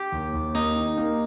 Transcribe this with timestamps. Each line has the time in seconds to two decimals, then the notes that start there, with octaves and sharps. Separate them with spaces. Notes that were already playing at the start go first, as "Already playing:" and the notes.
Already playing: G4
0.12 D#2
0.34 D#2
0.55 A#3 D#4
0.77 D#3
0.98 A#3